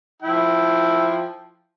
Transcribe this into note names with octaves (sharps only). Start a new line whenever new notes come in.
F3 E4 G5